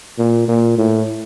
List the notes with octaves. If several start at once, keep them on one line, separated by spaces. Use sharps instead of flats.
A#2
A#2
A2